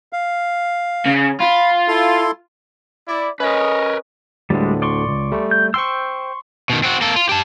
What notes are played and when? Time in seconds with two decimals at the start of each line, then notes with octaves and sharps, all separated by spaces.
0.13 F5
1.06 C#3
1.40 F4 B5
1.88 E4 A4 C6
3.07 E4 D5
3.40 C#4 A#4 B4 D#5
4.50 D2 A2 D3 G3 G#3
4.82 D5 C6 C#6
5.08 C#2
5.32 G3 A3
5.51 G6
5.74 C5 G5 C6 C#6 E6
6.70 B2 D#3
6.83 C4 F#4
7.01 A#3 A4
7.16 F4
7.29 G4 A5